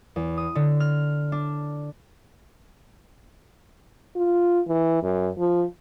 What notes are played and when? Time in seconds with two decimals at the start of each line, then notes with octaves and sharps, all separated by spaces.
0.16 E2
0.37 D#6
0.55 D3
0.80 F6
1.32 D4
4.15 F4
4.68 E3
5.03 F#2
5.39 F3